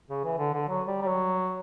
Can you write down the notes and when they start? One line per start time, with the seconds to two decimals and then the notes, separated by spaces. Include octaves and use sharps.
0.10 C#3
0.24 E3
0.39 D3
0.53 D3
0.68 F#3
0.87 G3
1.02 G3
1.07 F#3